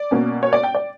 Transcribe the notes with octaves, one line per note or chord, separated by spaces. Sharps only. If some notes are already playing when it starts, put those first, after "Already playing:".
Already playing: D5
B2 A#3 C#4
C#5
D5
G5
D5